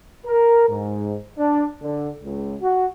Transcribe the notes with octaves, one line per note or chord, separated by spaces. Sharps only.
A#4
G#2
D4
D3
C#2
F#4